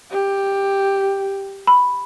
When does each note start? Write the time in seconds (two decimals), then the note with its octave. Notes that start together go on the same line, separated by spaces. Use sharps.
0.10 G4
1.67 B5